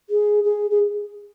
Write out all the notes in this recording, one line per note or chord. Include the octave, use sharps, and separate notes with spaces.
G#4
G#4
G#4